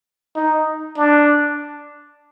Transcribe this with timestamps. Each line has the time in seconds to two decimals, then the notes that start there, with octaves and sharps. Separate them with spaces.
0.36 D#4
0.97 D4